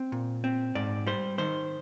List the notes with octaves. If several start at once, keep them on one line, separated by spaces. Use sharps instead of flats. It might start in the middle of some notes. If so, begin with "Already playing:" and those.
Already playing: C4
A#2
C4
G#2 D5
G3 C5
D#3 C5